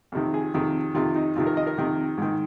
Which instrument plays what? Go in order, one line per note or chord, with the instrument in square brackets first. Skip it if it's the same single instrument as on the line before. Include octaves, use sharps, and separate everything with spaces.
[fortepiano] F2 C3 D#3
G#4
F2 C3 D#3
F2 C3 D#3 F4
D#4
F2 C3 D#3 F4
A#4
D#5
A#4
F2 C3 D#3
G#2 D#3